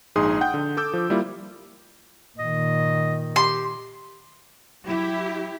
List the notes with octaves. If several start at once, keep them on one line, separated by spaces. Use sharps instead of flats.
A#1 G#2 D#4 G#4 C6 D#6
F#5 G5 G6
D3
A4 D6 E6 G6
F3
G3 A#3 E4 F4
A#2 D#3 D#5
G4 C6
F#3 E4 G4